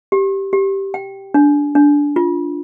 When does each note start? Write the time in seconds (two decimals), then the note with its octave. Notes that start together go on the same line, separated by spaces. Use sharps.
0.12 G4
0.53 G4
0.94 G5
1.34 D4
1.75 D4
2.16 F4